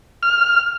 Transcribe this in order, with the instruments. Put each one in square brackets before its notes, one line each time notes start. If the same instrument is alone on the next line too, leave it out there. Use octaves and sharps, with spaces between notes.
[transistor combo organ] F6